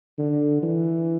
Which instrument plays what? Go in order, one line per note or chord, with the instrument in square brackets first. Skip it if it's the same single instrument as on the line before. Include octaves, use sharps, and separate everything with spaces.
[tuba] D3
E3